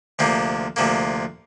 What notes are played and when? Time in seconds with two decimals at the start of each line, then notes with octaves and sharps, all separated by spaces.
0.19 D2 C3 F3 A#3
0.76 D2 C3 F3 A#3